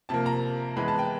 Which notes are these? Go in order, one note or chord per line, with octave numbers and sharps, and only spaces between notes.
C3 F3 A#3 A5
A#5
E3 G#3 B3 B5
A5
G5